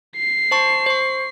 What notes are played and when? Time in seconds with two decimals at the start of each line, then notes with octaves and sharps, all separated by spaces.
0.16 C7
0.51 C5 A5 C#6
0.86 C5 C#6